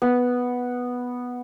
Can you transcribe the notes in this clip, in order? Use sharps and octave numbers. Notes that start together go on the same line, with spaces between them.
B3